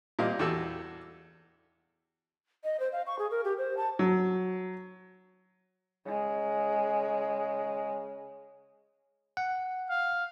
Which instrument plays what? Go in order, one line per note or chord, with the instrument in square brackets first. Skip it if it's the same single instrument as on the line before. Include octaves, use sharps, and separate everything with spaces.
[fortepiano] A#2 G3 C4 D#5 F5
E2 F#4 G4 A4 A5 E6
[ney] D#5
C5
F5
C#6
G#4
A#4
G4
C5
A5
[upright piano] F#3
[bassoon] C#3 [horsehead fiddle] G#3
[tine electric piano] F#5
[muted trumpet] F5